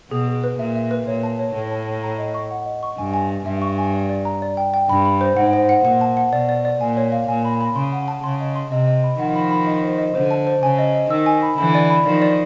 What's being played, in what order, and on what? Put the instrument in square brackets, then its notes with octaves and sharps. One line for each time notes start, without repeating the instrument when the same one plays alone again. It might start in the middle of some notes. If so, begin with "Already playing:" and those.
[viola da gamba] B2 [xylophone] G#4
[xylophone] G#4
B4
[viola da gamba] A#2 [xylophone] E5
[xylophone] E5
B4
[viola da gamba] A#2 [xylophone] C#5
[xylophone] A5
C#5
[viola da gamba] A2 [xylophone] A5
[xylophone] A5
A5
A#5
D#5
C#6
F#5
D#5
C#6
[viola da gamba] G2 [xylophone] G#5
[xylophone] G#5
G#5
[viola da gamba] G2 [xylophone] E5
[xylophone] C#6
G#5
D5
D5
A#5
D5
G5
G5
[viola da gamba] G2 [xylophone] B5
[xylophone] B5
C5
[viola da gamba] G#2 [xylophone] F#5
[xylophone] C5
F#5
[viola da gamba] A#2 [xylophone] F#5
[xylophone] A5
F#5
[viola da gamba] B2 [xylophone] D5
[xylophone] D5
D5
[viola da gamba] A#2 [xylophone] G#5
[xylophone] C#5
F5
[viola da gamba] A#2 [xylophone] G#5
[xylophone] B5
B5
[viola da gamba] C#3 [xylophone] C6
[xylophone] F#5
A5
[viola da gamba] C#3 [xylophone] C6
[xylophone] D#5
C6
[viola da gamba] C3 [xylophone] D#5
[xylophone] D#5
B5
[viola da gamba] D#3 F3 [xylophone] F#5
[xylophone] B5
B5
D#5
C5
D#5
[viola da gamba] D3 [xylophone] C5
[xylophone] A5
C5
[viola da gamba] C#3 [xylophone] G#5
[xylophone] D#5
D#5
[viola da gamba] D#3 [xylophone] E6
[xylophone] G#5
B5
[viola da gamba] D3 E3 [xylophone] B5
[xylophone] D5
B5
[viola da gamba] D#3 F3 [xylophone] D5
[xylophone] D5